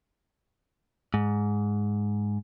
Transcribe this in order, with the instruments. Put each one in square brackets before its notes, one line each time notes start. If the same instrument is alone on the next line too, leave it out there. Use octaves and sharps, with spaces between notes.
[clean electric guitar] G#2